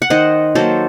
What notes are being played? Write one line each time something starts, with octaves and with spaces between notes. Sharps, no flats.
F#5
D#3 C5 D#5
F#3 A#3 A4 C5